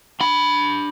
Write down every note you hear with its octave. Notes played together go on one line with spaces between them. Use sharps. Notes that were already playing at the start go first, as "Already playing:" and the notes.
D4 B5